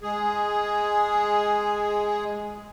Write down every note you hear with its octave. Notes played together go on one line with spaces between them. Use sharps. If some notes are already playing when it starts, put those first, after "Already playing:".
G#3 G#4